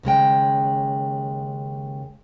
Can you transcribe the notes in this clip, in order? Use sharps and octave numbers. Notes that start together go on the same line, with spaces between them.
D#2 C#3 G#3 G5